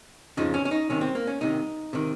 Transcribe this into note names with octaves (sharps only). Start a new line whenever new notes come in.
F2 C#3 F3 D#4
C#4
C#4
D#4
C2 C3 D#3 C#4
C4
A#3
C#4
C2 C3 D#3 D#4
C3 D#3